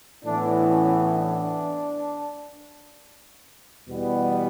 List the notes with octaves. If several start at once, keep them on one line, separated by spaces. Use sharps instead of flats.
A2 E3 B3 D4
C#4
D4
E2 B2 G3 B3